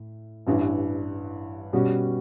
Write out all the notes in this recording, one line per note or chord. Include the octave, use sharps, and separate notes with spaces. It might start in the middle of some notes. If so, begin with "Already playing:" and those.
Already playing: A2
A1 G2 E3
B2 G3 C#4 F#4